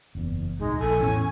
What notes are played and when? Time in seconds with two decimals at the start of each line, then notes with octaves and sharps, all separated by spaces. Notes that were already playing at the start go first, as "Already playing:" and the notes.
0.15 F#1 E2
0.59 D1 B1 G#3 D#4
0.79 A#1 A4 G#5
1.00 E2 A2 C#4